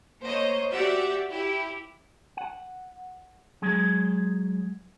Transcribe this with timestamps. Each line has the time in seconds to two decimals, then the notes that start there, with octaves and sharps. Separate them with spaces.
0.23 A#3 C5 C#5 D#5
0.72 F#4 G4 D5 E5 F#5
1.30 E4 G4
2.37 F#5
3.62 F#3 G#3 G#4